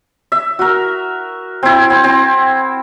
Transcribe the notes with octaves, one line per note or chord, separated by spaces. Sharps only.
E5
F#4 A#4
C4 E4
C4
C4